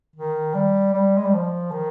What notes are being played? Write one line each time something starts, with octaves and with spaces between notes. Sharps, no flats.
D#3
G3
G3
G#3
G3
F3
D#3